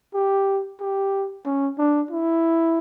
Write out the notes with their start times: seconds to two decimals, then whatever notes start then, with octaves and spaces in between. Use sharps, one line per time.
0.14 G4
0.80 G4
1.45 C#4
1.78 D4
2.11 E4